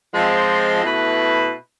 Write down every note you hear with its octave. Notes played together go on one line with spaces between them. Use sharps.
F3 G#3 C4
B2 A3 E4 B4